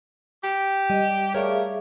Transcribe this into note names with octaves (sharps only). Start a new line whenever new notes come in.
G4
G3 D#5
A3 G#4 A#4 C#5 D5 E5 F5